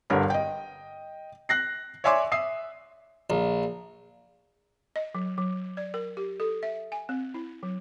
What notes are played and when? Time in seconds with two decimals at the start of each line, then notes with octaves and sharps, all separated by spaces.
0.10 G1 G2 D3 A#4 C#5 B5
0.30 D#5 G5
1.49 F#6 A#6 C7
2.04 C#5 D5 E5 G#5 C6 D6
2.32 E5 D#6 C7
3.30 A#1
4.96 D#5
5.15 F#3
5.38 F#3
5.77 D5
5.94 A#4
6.17 G4
6.40 A4
6.63 E5
6.92 G#5
7.09 C4
7.34 E4
7.63 F#3